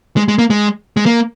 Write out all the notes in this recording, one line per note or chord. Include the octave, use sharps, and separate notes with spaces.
G#3
G#3
A#3
G#3
G#3
A#3